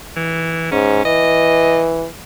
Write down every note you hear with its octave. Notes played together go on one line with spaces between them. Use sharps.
E3
G#2 C#4
E3 D#5